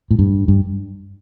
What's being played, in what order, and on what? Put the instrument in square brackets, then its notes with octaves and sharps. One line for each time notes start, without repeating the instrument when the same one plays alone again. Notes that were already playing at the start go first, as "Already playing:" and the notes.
[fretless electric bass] A2
G2
G2